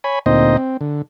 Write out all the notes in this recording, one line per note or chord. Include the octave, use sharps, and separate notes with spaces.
C#5 G#5 B5
D2 A#2 C4 D#4 C5 D#5
C4
D3